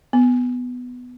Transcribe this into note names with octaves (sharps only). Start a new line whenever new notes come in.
B3